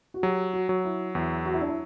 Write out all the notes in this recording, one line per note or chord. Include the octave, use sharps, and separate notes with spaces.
F#4
F#3 G4
F#4
F#3
E4
E2 E4
F#4
E4
D4
E4